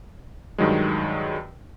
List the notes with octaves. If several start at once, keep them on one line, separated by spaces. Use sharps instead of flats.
G2 D#3 F#3 G#3